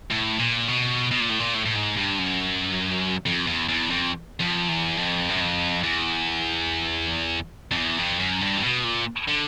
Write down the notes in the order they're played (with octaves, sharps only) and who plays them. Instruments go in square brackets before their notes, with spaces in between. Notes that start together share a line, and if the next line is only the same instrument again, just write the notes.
[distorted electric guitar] A2
A#2
B2
B2
A#2
A2
A#2
A2
A2
G#2
G2
F#2
F2
E2
E2
F2
F2
E2
F2
F#2
F2
E2
F2
E2
F2
F#2
G2
C3
B2
A#2
D3